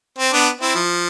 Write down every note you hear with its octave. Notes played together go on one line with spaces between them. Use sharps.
C4
B3 D4
C4 E4
F3